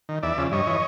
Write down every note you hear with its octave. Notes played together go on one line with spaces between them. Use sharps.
D#3
E2 D5 E5
C#3 F3
G2 C#5 D#5
E3